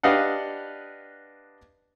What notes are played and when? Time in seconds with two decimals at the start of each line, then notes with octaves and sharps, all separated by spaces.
0.03 D4 G4 B4 D#5 F5 F#5